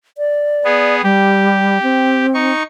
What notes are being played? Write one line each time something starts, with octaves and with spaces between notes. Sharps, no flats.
D5
B3 G#4
G3 G4
C4
D#4 C#6